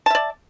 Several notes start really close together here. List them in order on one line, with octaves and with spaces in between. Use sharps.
A5 E5 D5